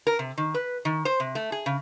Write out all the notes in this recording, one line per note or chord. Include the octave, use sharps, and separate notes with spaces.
A#4
C3
D#3
B4
D#3
C5
C3
A3
G#4
C#3